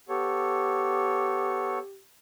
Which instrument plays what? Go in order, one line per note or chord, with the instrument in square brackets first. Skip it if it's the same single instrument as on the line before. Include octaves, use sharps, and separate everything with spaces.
[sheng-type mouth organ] B3 A4 C#5 [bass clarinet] G4